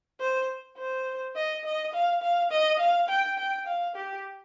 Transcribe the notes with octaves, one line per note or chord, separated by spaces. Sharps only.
C5
C5
D#5
D#5
F5
F5
D#5
F5
G5
G5
F5
G4